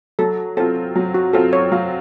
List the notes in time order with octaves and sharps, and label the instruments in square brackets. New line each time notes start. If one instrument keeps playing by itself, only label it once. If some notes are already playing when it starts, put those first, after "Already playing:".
[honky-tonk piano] F#3 [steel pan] A4
[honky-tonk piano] C4 F4 [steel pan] A4
[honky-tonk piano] F#3
[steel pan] F#4
[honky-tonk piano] C4 F4 [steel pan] A4
[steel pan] C#5
[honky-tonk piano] F#3 [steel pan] F5